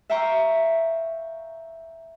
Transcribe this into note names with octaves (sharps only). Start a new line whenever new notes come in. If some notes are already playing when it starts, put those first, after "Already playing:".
E5 F5 G5 A#5 C6 C#6